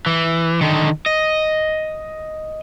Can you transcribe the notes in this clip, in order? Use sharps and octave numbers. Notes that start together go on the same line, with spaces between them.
E3
D3 D#3
D#5